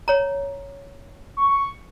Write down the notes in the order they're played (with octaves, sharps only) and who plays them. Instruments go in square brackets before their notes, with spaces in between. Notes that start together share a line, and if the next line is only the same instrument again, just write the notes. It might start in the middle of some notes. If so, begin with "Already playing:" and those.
[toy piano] C#5 A#5
[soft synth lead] C#6